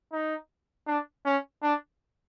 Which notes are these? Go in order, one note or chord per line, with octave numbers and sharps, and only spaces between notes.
D#4
D4
C#4
D4